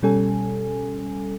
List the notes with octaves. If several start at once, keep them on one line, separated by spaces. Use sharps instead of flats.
B2 G3 C#4 A4 G#5